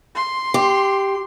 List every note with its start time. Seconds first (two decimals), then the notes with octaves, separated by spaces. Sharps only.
0.16 C6
0.54 G4